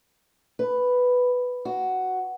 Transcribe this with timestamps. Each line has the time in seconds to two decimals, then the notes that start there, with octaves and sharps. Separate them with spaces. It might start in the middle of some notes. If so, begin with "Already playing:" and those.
0.59 B4
1.65 F#4